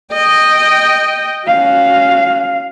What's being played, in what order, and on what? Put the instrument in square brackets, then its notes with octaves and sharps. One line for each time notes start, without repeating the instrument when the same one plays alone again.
[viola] D#5 G5
[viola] C#4 F#4 [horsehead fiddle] F5